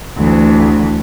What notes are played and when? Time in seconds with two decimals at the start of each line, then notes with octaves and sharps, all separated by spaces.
0.18 D2 E3